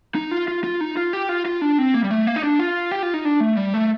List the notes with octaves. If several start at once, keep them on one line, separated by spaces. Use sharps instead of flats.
D#4
F4
F4
F4
D#4
F4
G4
F4
F4
D4
C4
A#3
G3
A3
A#3
D#4
D4
F4
G4
F4
D#4
D4
A3
G3
A3